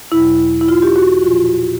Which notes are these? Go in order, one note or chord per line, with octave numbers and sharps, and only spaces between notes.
E2 B2 F#3 E4
E4
F4
G4
F#4
A#2 F3 F4